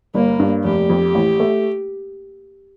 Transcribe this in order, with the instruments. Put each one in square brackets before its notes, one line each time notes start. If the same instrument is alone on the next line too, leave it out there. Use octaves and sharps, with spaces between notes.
[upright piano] G1 [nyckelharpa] A#3
[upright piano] G2
[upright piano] F1 [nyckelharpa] G4
[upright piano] F2
A1
A3